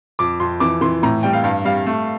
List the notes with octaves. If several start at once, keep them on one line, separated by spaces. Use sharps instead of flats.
F2 D6
F2 C6
E3 D6
E3 C6
A2 A#5
G3 G5
F5
G2 F5
G3 F5
A3